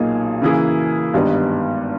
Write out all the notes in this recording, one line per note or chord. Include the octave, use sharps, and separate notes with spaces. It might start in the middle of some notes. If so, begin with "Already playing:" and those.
Already playing: B1 A#2 A#3 D#4 G#4
C#3 E3 A#3 E4 G#4
G#1 G2 G3 B3 D#4